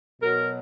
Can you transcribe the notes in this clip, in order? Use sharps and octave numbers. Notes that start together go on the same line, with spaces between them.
B2 F#3 A#4